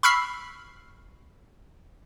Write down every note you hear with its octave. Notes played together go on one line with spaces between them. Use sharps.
B5 C#6 E6 F6 B6 C7